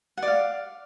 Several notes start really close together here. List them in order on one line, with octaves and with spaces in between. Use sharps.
F#5 D5 F5